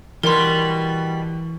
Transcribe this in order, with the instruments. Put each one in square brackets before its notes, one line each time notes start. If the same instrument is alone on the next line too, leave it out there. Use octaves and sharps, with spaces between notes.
[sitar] B2 G3 [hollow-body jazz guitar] E3 B4 [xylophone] A#4 C6